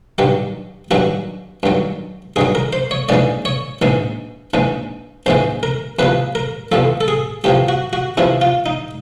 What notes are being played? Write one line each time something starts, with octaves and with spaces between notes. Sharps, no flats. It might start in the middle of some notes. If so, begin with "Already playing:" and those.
G2 D#3 F#3 G4
G2 D#3 F#3 F#4
G2 D#3 F#3
G2 D#3 F#3 G#4
A#4
C5
C#5
A#1 G#2 E3 G#3 D5
C#5
A#1 G#2 E3 G#3
A#1 G#2 E3 G#3
A#1 G#2 E3 G#3 C5
A#4
E2 C3 F3 B4
A#4
E2 C3 F3 A4
A4
G#4
E2 C3 F3 G4
F#4
F#4
E2 C3 F3 E4
F4
D#4